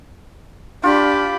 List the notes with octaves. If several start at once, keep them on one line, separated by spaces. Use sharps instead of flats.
D4 F4 G4 B5